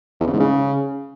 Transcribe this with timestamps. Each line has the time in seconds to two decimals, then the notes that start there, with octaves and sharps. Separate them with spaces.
0.21 E2
0.27 C#3
0.33 G#2
0.40 C#3